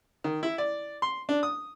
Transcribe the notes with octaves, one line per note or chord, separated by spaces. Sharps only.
D#3
E4
D5
C6
D4
D#6